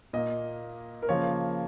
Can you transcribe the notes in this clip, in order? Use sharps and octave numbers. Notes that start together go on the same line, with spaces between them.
A#2 A#3 D#5
A#4
C#3 F3 A#3 C#5